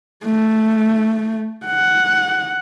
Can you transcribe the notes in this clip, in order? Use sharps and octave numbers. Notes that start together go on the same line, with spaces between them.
A3
F#5